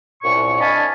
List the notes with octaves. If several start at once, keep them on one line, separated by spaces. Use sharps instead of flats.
C2 F#2 A#2 C#6
D4 D#5 F5 G#5 A5 B5